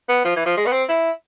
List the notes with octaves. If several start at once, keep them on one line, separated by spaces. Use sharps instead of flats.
B3
F3
E3
F3
G#3
B3
C4
E4